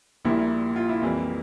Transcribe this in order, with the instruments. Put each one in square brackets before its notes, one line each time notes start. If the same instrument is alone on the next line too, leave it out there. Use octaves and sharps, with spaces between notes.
[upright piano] A#1 A#2 G3 A#3 E4
F4
E4
F2 E3 G3 A#3